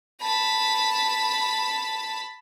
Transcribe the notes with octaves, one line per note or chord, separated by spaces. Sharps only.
A5 B5